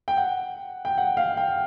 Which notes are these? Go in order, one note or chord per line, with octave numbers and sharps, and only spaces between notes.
G5
F#5
G5
F#5
F5
G5